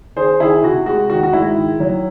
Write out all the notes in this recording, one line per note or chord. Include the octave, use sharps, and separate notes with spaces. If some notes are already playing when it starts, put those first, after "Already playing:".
D#3 G#4 C5
D#3 E4 G#4
C3 F#4
G#3 F#4
D#3 F#4
F#4
G#2 E4
D#3
F#3